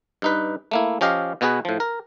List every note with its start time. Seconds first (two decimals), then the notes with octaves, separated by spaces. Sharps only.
0.22 G2 D#4 B4
0.71 A3 A#3 E4
1.01 F3 C#4 G4 D#5 F5
1.41 B2 B3 F#4 G#4 B4
1.65 A2 F3
1.80 A#4